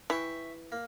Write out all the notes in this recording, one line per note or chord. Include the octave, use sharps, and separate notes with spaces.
E3 E5 G5 C#6
A#3